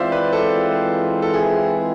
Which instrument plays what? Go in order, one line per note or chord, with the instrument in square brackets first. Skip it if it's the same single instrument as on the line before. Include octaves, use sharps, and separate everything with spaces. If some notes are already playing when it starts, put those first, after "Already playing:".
Already playing: [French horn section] E3 G#3 C4 F4 [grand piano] C5 D5 E5 F5
[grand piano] B4 D5
A4 C5
A4
E4 G#4